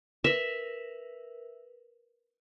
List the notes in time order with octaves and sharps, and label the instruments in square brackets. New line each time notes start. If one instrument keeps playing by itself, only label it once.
[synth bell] A#4 B4 [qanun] E5